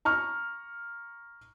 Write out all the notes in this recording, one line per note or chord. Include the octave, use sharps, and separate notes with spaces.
A#5 C#6 F6